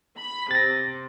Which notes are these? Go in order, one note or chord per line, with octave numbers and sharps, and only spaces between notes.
B5
C3 A6 A#6